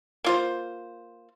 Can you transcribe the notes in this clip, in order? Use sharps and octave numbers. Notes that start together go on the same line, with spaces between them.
A#3 F4 C5